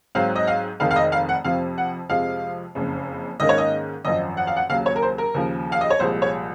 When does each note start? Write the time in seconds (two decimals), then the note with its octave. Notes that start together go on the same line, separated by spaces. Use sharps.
0.15 G#2 F#3 C4 F5
0.36 D#5
0.47 F5
0.80 F1 F2 D#3 G#3 F5
0.91 F5
0.96 D#5
1.12 F5
1.29 F#5
1.44 F2 C3 F3 C4 F5
1.78 F#5
2.09 F2 C3 F3 G#3 F5
2.75 F#1 F2 C#3
3.40 G#2 D#3 A#3 C#4 D#5
3.49 C#5
3.58 D#5
4.05 G#1 F#2 F3 D#5
4.37 F#5
4.47 F5
4.56 F#5
4.69 D#2 C#3 F#3 F5
4.86 C#5
4.96 A#4
5.02 C5
5.18 A#4
5.34 D#2 C#3 F3
5.72 F5
5.81 D#5
5.90 C#5
5.99 C2 A#2 F3 G#3 C5
6.22 C#5